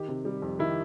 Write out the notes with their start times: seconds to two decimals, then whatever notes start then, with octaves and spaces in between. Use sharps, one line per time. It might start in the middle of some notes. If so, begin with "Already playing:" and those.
Already playing: D#3 G4
0.08 C3
0.25 G3
0.42 F2
0.59 D#3 E4